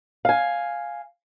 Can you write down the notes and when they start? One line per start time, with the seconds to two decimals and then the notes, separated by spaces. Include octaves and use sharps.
0.25 F5 G#5